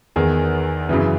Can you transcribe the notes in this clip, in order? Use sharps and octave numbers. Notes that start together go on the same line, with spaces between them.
E2 D#3 G#4
F#2 C#3 E3